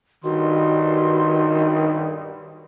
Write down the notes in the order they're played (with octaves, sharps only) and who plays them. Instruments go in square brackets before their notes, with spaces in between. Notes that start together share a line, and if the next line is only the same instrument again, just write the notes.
[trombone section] B1 G2 [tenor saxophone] D#3 [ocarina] F#4 [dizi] C6